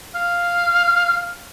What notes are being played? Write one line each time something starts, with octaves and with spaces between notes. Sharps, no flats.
F5